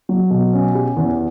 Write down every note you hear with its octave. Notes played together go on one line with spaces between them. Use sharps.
F#3
B2
C#4
G4
E2